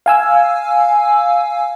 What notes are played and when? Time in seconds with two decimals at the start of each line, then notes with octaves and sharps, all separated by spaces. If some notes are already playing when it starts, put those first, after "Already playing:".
0.06 F5 G#5 E6